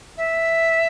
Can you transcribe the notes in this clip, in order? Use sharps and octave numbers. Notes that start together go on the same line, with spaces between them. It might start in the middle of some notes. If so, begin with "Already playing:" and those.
E5